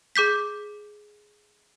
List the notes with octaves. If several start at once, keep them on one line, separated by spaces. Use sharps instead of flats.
G#4 D6 G6 B6